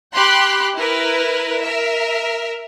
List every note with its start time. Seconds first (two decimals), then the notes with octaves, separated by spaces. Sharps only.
0.13 G4 G5 B5 C6 F#6
0.76 E4 A#4 B4
1.62 A#4 E5